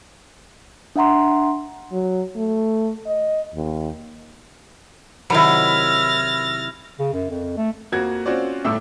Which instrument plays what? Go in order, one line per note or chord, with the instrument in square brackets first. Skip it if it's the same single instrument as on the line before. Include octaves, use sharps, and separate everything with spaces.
[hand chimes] D4 E5 F#5 A#5 C6
[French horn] F#3
A3
D#5
D#2
[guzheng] C3 D#3 F#3 [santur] E4 B5 [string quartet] F6 A6 A#6
[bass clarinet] C#3
F#2
F2
A3
[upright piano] F2 F3 A#3 F#4 G#6
C4 C#4 F4 F#4 C5 D5
G1 A2 A3 A4 D6 E6